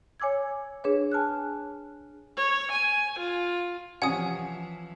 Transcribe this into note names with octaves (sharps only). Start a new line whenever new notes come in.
C#5 G#5 D6 E6 G#6
D4 G#4 B4 C#5
G#5 A5 F6 F#6
C#5
G#5
F4
C3 E3 F3 C#4 F#5 G#5 D#6